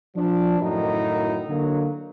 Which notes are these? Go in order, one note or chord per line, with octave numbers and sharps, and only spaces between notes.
F3 D4
F#2 A2 D#3 D#4 E4 F#4
D3 F#3 A#3